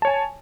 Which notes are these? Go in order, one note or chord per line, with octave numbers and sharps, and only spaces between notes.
C#5 G#5 A5